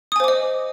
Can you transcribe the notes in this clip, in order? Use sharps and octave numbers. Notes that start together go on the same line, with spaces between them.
C5 D#5 G#5 D6 D#6